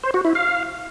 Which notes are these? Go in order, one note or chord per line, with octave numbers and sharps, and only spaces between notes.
C5
F#4
E4
F5